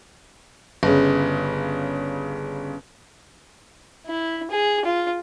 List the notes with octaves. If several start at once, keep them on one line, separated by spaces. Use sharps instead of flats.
G1 C#3
E4
G#4
F4